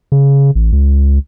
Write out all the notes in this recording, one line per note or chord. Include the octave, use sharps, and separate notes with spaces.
C#3
A1
C#2